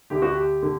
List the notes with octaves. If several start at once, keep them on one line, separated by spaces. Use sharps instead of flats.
D2 D3 G4
F#4
G4
D3